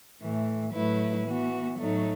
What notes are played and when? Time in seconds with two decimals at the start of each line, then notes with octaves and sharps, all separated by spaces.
0.22 A2 E3 A3
0.73 A2 F#3 A3 E4 B4
1.27 E3 B3 F#4
1.79 A2 F#3 A3 D#4